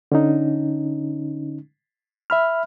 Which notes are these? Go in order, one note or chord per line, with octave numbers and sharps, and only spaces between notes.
D3 C#4 D#4
E5 B5 F6